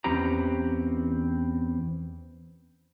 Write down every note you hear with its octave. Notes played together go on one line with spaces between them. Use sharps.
E2 C4 C#4 G4 B4 A#5